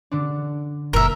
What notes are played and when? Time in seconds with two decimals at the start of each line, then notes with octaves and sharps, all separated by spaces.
0.11 D3 D4
0.93 F#1 A#2 A#4 E5